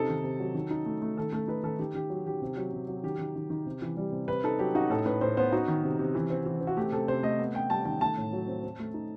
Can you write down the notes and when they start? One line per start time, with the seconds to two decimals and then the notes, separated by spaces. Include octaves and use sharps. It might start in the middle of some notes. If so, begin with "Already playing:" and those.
Already playing: C3 D#4 A4
0.09 D#3
0.24 C3
0.40 F#3
0.54 D#3
0.71 D#4
0.86 A3
1.02 A3
1.17 D#3 A4
1.32 A3 A4
1.48 D#4 B4
1.63 D#3 A4
1.79 D#3 G4
1.94 D#3 G4
2.10 F#3
2.26 D#3 G4
2.42 C3
2.57 F#3
2.73 C3
2.88 F#3
3.03 D#3 G4
3.19 D#3
3.35 D#3
3.50 D#3
3.66 C3
3.82 E3
3.97 G3
4.12 C3
4.28 C3 B4
4.44 D#4 A4
4.59 F#3 G4
4.75 D#4 F#4
4.90 A2 A4
5.06 A2 B4
5.21 A2 C5
5.37 B3 C5
5.52 D#4 F#4
5.68 D#3
5.83 C3
5.99 C3
6.15 E3
6.30 C4
6.46 E3
6.61 C4
6.67 F#4
6.77 A3 G4
6.92 C3 A4
7.08 C3 C5
7.23 A3 D#5
7.39 B3
7.54 B3 G5
7.70 G3 A5
7.85 D#3 G5
8.01 A3 A5
8.17 A2
8.33 F#3
8.47 C4
8.63 C4
8.79 A3
8.94 D#4